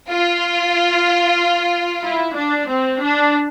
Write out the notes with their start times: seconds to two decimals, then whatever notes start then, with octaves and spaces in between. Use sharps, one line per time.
0.10 F4
2.04 E4
2.36 D4
2.68 C4
3.00 D4